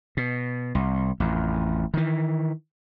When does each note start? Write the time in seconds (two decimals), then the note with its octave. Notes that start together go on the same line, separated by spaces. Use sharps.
0.17 B2
0.75 C2
1.20 A1 F2
1.94 D#3 E3